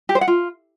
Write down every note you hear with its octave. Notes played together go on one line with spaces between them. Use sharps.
G4
C5
F#5
F4